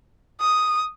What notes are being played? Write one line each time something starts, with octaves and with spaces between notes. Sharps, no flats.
D#6